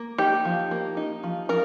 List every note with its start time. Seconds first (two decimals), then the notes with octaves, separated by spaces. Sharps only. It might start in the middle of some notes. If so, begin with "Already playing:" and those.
Already playing: A#3
0.18 D#4 G4
0.45 F3
0.71 A#3
0.97 D#4
1.24 F3
1.49 F3 A#4